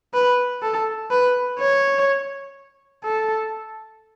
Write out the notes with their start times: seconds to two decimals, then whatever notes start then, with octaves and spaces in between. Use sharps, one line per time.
0.14 B4
0.62 A4
1.11 B4
1.59 C#5
3.04 A4